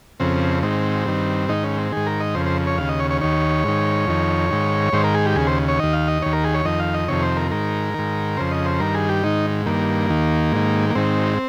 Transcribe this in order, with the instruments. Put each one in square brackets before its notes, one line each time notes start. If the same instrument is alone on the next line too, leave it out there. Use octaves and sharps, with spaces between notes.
[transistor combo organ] F2 C#3 C4
G#2 D#3 C4
G2 D#3
G#2 D#3 D#4
C#4
C4
G#2 D#3 G#4
A#4
D#5
F2 C#3 C5
C5
C#5
D#2 C#3 F5
D#5
C#5
C#5
D#2 D#3 C#5
G#2 D#3
F2 D#3
G#2 D#3
G#2 D#3 C5
A#4
G#4
G4
D#2 C#3 G#4
C5
C#5
D#2 D#3 D#5
F5
D#5
D#2 D#3 C#5
A#4
G#4
C#5
F2 D#3 D#5
F5
D#5
F2 C3 D#3 C#5
C5
A#4
G#2 D#3 A#4
G#2 D#3
F2 C#3 C5
D#5
C5
G2 D#3 A#4
G#4
G4
G#2 D#3 D#4
G2 D#3 A#3
D#2 D#3
G#2 D#3
A#3
G#2 D#3 C4